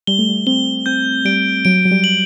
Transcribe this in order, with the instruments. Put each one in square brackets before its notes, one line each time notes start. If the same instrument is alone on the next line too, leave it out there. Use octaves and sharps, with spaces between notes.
[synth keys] G3 [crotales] G7
[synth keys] A3
G3
[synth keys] C4 [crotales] G7
[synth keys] C4 [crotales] G6
[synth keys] G3 [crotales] D7
[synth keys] F#3 [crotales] D7
[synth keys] F#3
G3
[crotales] F#7